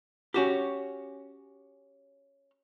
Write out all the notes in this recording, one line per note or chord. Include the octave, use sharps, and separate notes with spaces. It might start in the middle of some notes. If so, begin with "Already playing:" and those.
C#4 F#4 G4